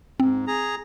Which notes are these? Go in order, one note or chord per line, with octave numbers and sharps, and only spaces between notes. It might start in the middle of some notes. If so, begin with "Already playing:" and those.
G#2 C4
G#4 A#5